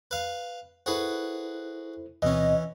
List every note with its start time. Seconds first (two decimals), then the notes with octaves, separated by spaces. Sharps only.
0.11 B4 F5
0.86 E4 F#4 G#4 A4 B4 C5
2.22 D2 B2 E3 C4 C#4 D#5